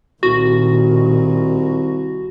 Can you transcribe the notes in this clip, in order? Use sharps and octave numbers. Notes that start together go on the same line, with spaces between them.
C2 A#2 D#3 F#4